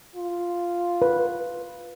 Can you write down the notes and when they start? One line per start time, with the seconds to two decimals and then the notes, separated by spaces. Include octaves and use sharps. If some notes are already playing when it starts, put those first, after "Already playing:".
0.16 F4
1.02 B4